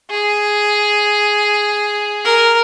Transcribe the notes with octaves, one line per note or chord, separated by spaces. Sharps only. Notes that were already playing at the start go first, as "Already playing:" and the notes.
G#4
A#4